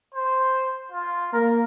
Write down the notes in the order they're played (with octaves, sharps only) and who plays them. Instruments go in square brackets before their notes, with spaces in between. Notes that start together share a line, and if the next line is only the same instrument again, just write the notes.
[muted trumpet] C5
F4
[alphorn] A#3 [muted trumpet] A#4